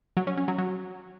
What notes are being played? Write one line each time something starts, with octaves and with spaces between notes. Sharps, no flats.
F#3
C#4
C#4
F#3
F#3